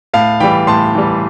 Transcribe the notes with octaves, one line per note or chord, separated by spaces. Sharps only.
A2 F5 A5
E3 G3 G5 B5
A2 A5 C6
E3 G3